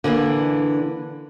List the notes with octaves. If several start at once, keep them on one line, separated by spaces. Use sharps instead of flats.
D3 E3 A#3 D4